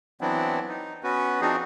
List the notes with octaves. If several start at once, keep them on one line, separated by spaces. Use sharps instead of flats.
E3 F#3 B3 C4 D4 E4
D#4
B3 C#4 F#4 B4
F3 C4 D4 D#4 F#4 G#4